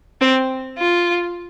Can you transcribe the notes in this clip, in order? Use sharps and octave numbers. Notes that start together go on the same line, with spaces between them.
C4
F4